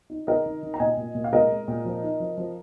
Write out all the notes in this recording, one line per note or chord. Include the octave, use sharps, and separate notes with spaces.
D#4
D#3 A#4 D#5
D#3
D#3
A#5
A#2 D#5 G#5
A#2
A#2
F5
G#3 A#4 D#5
G#3
A#2
F3
D#4
F3
F3